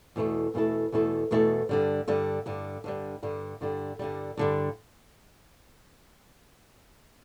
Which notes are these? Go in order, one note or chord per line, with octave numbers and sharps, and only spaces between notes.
E2 B2 A3 E4 A4
E2 B2 A3 E4 A4
E2 B2 A3 E4 A4
E2 B2 A3 E4 A4
G2 D3 G3
G2 D3 G3
G2 D3 G3
G2 D3 G3
G2 D3 G3
G2 D3 G3
G2 D3 G3
G2 D3 G3